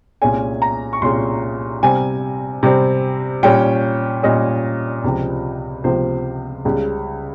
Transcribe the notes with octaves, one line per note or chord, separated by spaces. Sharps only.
C2 A#2 G#3 C#4 G#5
A#5
C#6
C2 A#2 G#3 C#4 C6
C3 G3 C4 G#5
C3 G3 C4
A#2 G3 C#4 G5
A#2 G3 C#4 D#5
C#2 C3 F3
C#2 C3 F3 C5
C#2 C#3 G3